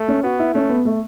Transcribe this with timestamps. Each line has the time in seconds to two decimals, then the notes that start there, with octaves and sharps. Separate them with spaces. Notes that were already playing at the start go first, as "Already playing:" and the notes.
Already playing: A3
0.08 C#4
0.23 B3 F#4
0.39 E4
0.54 A3 C#4
0.69 B3
0.85 A3